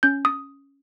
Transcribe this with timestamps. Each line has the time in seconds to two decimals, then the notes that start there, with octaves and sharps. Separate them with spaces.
0.03 C#4 G6
0.25 D#6